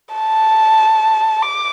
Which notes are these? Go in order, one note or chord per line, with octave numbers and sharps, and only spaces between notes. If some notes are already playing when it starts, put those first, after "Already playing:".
A5
D6